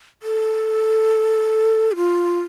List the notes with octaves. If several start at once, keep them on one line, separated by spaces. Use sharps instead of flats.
A4
G4
F4